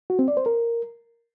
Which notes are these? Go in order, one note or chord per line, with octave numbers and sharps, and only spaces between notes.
F#4
C4
D5
C5
A#4